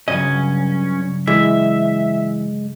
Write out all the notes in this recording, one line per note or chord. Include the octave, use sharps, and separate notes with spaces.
C#2 G2 C#3 F#3 C#4 D#5
E3 G#3 E5